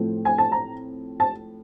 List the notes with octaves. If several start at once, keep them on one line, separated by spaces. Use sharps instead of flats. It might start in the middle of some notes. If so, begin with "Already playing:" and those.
Already playing: A2 F3 A3 C4
G#5
A5
A#5
A5